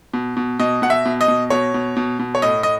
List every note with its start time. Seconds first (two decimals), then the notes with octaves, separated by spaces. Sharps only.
0.14 B2
0.37 B2
0.60 B2 D#5
0.82 B2 F#5
0.90 E5
1.06 B2
1.21 D#5
1.28 B2
1.50 B2 C#5
1.74 B2
1.97 B2
2.19 B2
2.35 C#5
2.42 A2 D#5
2.63 D#5